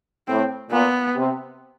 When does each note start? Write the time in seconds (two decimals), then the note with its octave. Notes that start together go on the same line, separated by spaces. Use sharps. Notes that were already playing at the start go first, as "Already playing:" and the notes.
0.27 A2 C4
0.71 A#2 B3
1.15 C3